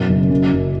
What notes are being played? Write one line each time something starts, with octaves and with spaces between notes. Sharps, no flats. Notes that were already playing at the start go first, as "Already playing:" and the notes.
Already playing: F#2 B2
F#1
F#2
F#1